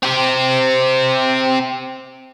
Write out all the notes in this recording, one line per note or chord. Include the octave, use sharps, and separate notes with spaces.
C4 G4